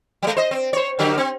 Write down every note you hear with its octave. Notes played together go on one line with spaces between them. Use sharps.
F#3 G#3
C5 D#5
C4
C5 C#5
D3 F#3 G4
C4